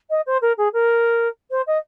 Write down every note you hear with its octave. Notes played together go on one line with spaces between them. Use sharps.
D#5
C5
A#4
G#4
A#4
C5
D#5